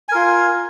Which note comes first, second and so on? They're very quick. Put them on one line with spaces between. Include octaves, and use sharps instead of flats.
G#5 A#4 F4